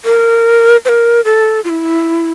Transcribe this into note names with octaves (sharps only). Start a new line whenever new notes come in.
A#4
C5
A#4
A4
F4
E4